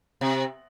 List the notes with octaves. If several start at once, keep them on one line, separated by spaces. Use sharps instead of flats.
C3